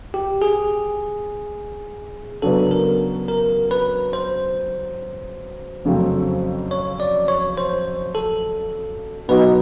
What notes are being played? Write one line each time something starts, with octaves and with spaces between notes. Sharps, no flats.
G4
G#4
C#3 F#3 B3 D4 A4
A#4
A#4
B4
C5
F2 C#3 F#3 A3 C4
C#5
D5
C#5
C5
A4
B2 F#3 B3 D#4 F#4 B4